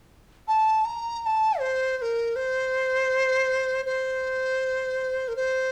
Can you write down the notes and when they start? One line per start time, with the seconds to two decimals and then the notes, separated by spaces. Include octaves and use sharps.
0.47 A5
0.85 A#5
1.21 A#5
1.26 A5
1.59 C5
1.97 C5
2.01 A#4
2.35 C5
3.85 C5
5.28 A#4
5.36 C5